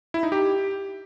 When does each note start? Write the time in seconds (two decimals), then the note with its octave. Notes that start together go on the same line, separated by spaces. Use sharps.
0.14 E4
0.23 D#4
0.32 G4